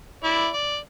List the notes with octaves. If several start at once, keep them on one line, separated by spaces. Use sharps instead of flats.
E4 D5
D5